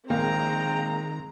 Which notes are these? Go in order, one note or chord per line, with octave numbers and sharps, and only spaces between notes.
A#1 D#3 G#3 A#3 C4 G5 A#5